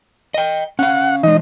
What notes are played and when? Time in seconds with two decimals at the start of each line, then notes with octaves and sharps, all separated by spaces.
0.34 D#5 G5
0.79 C#4 F5 F#5
1.23 E3 G#3 D#4 D#5